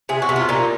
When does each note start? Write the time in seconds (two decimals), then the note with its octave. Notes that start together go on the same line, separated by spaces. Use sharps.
0.09 C3 G#4
0.22 F#4
0.29 C3
0.36 F4
0.49 A#2 D#4